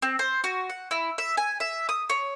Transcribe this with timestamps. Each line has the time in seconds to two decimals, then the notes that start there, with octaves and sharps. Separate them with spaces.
0.02 C4
0.19 C5
0.44 F#4
0.70 F#5
0.91 E4
1.18 E5
1.37 G#5
1.60 E5
1.89 D#6
2.10 C#5